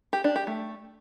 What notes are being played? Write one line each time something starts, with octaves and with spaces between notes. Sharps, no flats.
G4
D4
G4
A3